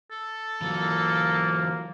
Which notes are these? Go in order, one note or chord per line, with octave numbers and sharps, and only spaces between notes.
A4
E3 F#3 A#3